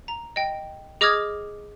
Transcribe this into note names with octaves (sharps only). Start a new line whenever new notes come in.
A#5
D#5 G5
G#4 D#5 D6 D#6 F6 G#6